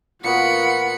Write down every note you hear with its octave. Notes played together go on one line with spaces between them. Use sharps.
A#2 B3 F4 F#4 F#5 B5 C#7